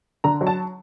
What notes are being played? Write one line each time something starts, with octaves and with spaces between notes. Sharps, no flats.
D3 A#5
F#3
A5